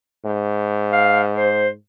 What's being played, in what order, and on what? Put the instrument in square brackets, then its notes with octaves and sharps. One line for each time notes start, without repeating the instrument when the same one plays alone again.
[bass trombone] G#2
[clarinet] F5
C5